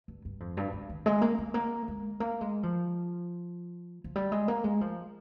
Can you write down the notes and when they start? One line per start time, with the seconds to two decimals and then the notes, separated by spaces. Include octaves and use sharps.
0.08 G2
0.25 G2
0.40 F2
0.57 G2
0.73 G#2
0.90 D#3
1.06 G#3
1.22 A#3
1.38 G#3
1.54 A#3
1.88 G#3
2.20 A#3
2.41 G#3
2.63 F3
4.04 F3
4.16 G3
4.32 G#3
4.48 A#3
4.64 G#3
4.81 F3